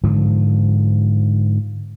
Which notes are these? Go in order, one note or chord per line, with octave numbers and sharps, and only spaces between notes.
G#2 D3 F3